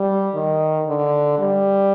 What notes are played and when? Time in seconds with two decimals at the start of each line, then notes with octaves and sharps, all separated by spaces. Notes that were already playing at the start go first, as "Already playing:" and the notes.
Already playing: G3
0.35 D#3
0.87 D3
1.38 G3